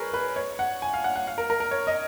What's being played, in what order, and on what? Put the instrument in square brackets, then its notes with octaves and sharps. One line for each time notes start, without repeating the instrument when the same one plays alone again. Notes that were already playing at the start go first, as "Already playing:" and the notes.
Already playing: [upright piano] G#4 A#4 B4 C#5
B4
C#5
F#5
G#5
F5
F#5
F#5
F5
A#4
A#4
A#4
C#5
D#5